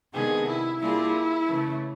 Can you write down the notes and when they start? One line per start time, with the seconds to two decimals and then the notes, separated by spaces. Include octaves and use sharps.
0.14 C3 D#3 G#3 B3 D4 G#4
0.48 E4
0.81 G3 A#3 D4 E4 F4 G#4
1.48 C#3 E3 A3